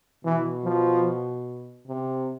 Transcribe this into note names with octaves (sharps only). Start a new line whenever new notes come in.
B2 E3
F3
C3